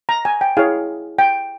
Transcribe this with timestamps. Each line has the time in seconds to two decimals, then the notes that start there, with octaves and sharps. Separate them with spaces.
0.09 A#5
0.25 G#5
0.41 G5
0.57 E4 G#4 C#5 F5
1.19 G5